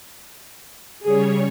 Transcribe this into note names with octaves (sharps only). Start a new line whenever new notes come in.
C#3 G3 G#4 C#5